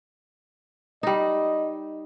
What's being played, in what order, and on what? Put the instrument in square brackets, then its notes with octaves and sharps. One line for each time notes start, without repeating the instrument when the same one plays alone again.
[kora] G3 D#4 [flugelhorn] D#5